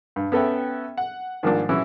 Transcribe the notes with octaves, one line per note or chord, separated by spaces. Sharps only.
G2
B3 C#4 A4 B4 E5 G5
F#5
G#2 D#3 F3 G3 A#3 D4
E3 F#3 C#4 E4 B4 E5